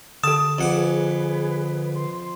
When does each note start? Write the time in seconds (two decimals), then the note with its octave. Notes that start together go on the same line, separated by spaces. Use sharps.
0.24 D3 A4 A5 D#6
0.58 F2 G#4 B4 F#5 D6
1.93 C6